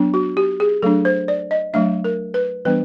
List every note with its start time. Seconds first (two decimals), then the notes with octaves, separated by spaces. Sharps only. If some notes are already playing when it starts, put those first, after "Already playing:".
Already playing: F#3 B3 D4
0.14 F#4
0.37 G4
0.60 G#4
0.82 F#3 A3 D4 A4
1.05 C5
1.28 D5
1.51 D#5
1.73 F#3 A3 D4 E5
2.04 A#4
2.34 B4
2.65 E3 G3 B3 D4 B4